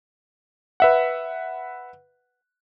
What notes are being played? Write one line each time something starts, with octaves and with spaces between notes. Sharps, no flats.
B4 E5 F#5